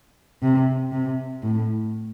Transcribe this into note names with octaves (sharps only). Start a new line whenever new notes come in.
C3
C3
A2